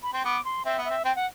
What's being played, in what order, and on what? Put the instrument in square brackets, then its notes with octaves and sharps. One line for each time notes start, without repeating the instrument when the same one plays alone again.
[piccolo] B5
[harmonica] C4 [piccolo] C6
[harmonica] B3 [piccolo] D6
[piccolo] C6
[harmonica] C4 [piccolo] E5
[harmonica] B3
[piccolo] E5
[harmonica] C4
[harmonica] C4 [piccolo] G5
[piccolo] F#5